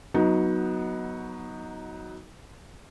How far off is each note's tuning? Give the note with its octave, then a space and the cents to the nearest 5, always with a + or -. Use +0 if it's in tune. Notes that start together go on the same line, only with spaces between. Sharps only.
F#3 +0 B3 -15 D#4 +20